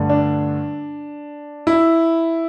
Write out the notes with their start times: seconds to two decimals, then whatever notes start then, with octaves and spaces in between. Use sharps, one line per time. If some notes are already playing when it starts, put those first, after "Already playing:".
Already playing: G2 D3 A3
0.10 D4
1.67 E4